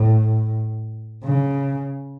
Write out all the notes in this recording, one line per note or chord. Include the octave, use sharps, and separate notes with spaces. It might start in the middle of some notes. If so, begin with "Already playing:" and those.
Already playing: A2
C#3